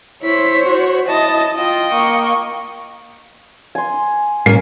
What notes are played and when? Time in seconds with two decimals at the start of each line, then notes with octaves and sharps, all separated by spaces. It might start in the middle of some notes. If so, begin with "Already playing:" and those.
0.22 E4 C5 C#5 B6
0.66 F#4
1.08 E4 D#5 A5 A#6
1.57 F4 D#5 G5
1.92 A#3 C#6
3.75 G#5 C6
4.46 A2 A#3 C#4 C7